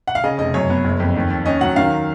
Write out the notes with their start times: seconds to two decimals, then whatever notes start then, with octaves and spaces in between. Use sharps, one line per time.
0.07 F#5
0.15 F5
0.24 C#3 D#5
0.38 F1 D#5
0.54 F#2 C#5
0.70 B3
0.84 F#1
1.00 F2
1.16 D#2
1.30 D#2
1.46 C#4 D#5
1.61 F#3 F#5
1.76 D#3 F5